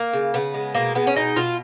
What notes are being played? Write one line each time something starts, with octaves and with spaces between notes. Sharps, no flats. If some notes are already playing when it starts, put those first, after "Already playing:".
Already playing: A#3
C#3
C#3 B3
G#3
B2 A#3
G#3 B3
C#4
B2 D#4
B2 F4